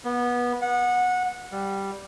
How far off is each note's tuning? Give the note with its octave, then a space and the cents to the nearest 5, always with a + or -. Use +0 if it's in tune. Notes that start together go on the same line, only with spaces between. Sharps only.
B3 -20
F#5 -20
G3 +0